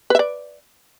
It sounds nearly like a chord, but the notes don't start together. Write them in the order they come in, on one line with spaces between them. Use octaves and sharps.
B4 E5 D5